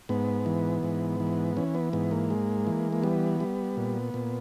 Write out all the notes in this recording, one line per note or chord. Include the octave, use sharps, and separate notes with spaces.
G#2 B3
E3
G#2
E3
E3 C#4
B3
G#2 B3
A#3
G#3
E3
A#3
G3 B3
G3
A#2
A#2